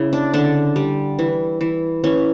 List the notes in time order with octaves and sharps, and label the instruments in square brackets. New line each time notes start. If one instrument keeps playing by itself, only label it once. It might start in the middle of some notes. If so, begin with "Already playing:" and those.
Already playing: [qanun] C#3 E4
D4
D3 D4
G3
E3
E3
E3 C#4